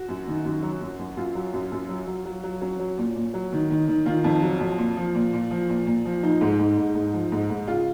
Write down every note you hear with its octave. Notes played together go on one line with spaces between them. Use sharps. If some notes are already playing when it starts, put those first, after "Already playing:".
Already playing: F#4
F#2
D#3
F#2
F#3
F#2
F#2
F#2 F4
F#3
F#2
F#2
F#3
F#3
F#3
F#3
F#3 C#4
F#3
A#2
A#2
F#3
D#3
D#3
D#3
D#3 F4
F2
F#3
F2
A#2
F3
A#2
A#2
F3
A#2
A#2
F3
F3 D#4
G#2
G#2
G#2
G#2
F3
G#2
G#2
C#3 F4